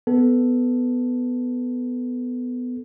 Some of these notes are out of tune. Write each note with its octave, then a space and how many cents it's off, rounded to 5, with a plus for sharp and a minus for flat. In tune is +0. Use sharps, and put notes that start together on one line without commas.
B3 +10 A4 +0